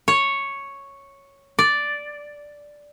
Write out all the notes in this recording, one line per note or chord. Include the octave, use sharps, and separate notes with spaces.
C#5
D5